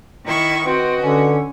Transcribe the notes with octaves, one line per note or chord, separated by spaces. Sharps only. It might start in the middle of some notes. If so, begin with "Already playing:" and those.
D#3 E4 C#6
C4 F#4 B4 D#5
D3 C#4